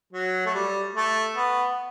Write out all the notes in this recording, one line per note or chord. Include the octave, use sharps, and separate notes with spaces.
F#3
A3
G3
A3
B3